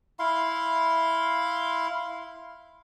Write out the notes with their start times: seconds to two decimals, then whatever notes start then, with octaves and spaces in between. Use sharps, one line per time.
0.19 E4 F5 C6